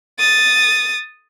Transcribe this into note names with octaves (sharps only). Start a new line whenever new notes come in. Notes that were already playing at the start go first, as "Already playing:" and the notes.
D#6 A6